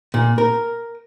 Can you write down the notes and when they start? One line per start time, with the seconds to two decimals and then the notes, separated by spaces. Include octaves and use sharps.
0.14 A#2
0.38 A#4